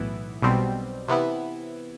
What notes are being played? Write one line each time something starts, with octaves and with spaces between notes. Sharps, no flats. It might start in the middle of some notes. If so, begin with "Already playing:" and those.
Already playing: B1 A2 E3 B3 E4
B1 B2 G3 C4
C3 E3 B3 E4